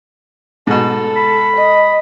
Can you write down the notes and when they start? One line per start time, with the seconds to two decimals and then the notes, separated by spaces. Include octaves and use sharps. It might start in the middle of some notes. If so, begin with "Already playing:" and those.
0.67 G#2 B2 A4
1.17 B5
1.56 D#5